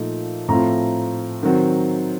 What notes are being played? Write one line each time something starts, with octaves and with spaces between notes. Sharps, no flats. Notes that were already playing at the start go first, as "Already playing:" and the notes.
Already playing: A#2 F3 A3 D#4
A2 F3 A3 C4 F4 A#5
D#3 F#3 C4